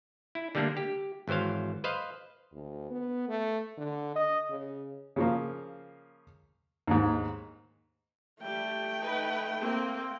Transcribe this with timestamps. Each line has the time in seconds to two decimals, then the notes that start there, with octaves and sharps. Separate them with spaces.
0.35 E4
0.55 D3 G3 A3 A#3 D4
0.77 G4
1.28 G#1 E3 F#3 C5 F5
1.84 B4 C5 D#5 F5
2.53 D2
2.90 B3
3.29 A3
3.78 D3
4.16 D#5
4.50 C#3
5.16 C#3 F3 A#3
6.87 D#2 G#2
8.42 G3 A3 G5
9.00 D#4 B4
9.61 A#3 C4